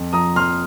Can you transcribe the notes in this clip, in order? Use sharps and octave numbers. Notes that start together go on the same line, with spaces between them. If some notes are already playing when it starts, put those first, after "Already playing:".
Already playing: F2
F3 A#5 D#6
F2 C6 F6